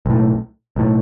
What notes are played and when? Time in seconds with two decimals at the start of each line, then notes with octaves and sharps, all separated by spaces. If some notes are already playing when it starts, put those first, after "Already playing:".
0.06 B1 A2
0.76 B1 A2